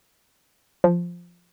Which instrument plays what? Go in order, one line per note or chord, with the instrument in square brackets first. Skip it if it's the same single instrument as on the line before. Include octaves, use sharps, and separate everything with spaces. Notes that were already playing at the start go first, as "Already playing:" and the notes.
[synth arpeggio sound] F3